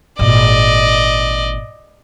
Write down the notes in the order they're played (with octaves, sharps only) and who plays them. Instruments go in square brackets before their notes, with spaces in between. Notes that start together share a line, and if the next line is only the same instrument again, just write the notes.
[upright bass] G#1 A#2 [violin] D5 D#5